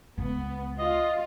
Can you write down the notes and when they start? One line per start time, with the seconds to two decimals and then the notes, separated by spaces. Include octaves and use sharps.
0.18 C#2 B3
0.79 F4 D#5